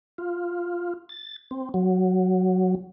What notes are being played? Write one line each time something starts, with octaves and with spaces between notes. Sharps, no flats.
F4
A6
C4
F#3